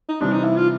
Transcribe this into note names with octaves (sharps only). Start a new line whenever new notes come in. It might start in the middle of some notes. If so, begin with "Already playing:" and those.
D#4
C3 E3 G3 C4 D4
D#4
E4
F4